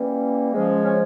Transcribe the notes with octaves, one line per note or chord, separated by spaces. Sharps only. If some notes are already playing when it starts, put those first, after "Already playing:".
Already playing: E3 G3 A#3 C#4
F3 G#3 C#4
C#4 C#5